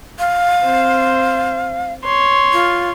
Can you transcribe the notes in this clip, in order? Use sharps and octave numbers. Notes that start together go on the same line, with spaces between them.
F5
C4 C5
C#5 C6
F4